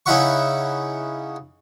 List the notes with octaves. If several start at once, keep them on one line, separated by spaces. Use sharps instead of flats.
C#3 D#4 E4 E5 F#5 C#6